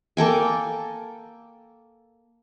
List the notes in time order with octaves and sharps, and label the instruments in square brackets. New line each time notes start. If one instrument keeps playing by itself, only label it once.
[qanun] A#3 A4 G5 G#5